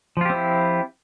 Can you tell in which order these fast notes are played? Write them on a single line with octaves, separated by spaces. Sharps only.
F3 F4 G4 C4 E4